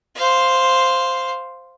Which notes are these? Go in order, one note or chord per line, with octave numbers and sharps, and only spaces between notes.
C5 F5